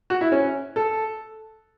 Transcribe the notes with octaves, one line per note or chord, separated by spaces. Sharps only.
F#4
E4
C#4
A4